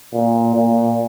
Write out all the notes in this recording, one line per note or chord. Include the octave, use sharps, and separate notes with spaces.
A#2
A#2